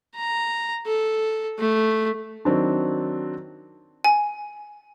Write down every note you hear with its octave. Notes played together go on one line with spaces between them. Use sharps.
A#5
A4
A3
D#3 F#3 C4 D4
G#5